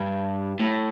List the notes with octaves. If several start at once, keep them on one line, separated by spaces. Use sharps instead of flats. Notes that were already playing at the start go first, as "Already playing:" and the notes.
Already playing: G2
A2